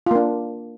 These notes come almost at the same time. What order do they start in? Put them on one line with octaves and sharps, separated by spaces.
F4 A#3 D4